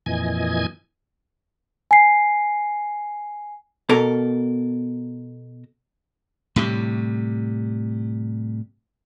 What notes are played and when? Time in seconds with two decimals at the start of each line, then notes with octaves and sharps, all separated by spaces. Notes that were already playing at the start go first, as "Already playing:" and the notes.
0.06 F2 A#2 E3 D#5 G#5 G#6
1.91 G#5 C7
3.89 B2 A4 A#4 A#5
6.56 A2 C3 G3